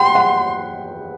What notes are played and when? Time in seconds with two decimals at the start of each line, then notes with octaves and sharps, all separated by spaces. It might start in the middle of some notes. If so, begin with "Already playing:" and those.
Already playing: F#5 G5 B5 C6
0.15 F#5